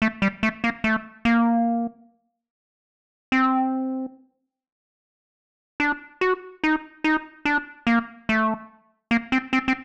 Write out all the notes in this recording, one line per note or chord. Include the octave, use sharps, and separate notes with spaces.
A3
G3
A3
A#3
A3
A#3
C4
D4
F#4
D#4
D#4
D4
A#3
A3
A#3
C4
C4
C4